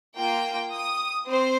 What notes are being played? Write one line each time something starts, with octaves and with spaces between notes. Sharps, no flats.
A#3 F4 G5
D#6
C4 C5